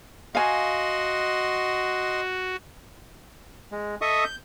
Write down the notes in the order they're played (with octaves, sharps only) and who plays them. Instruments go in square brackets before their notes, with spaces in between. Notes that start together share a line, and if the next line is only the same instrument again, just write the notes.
[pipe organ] F#4 [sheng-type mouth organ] D#5 C6 [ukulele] F5 G#5
[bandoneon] G#3
A4 D#5 E5 C#6 D#6
G6